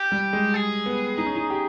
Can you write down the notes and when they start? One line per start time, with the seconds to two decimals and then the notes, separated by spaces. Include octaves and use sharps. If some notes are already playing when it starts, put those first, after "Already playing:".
Already playing: G4
0.12 G3
0.33 G#3
0.54 G#4
0.86 B3
1.18 D#4
1.26 C#4
1.36 D#4
1.50 G4